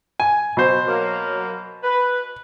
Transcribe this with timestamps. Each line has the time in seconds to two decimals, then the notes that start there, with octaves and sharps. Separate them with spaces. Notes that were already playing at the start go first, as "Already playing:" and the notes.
0.20 G#5
0.57 B2 C5
0.86 F#3 A#3
1.83 B4